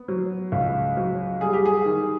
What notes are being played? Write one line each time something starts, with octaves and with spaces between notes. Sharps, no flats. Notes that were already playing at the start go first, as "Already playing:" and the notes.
Already playing: B3
F#3
C#2
F#3
G3 G#4
G4
G#4
D#3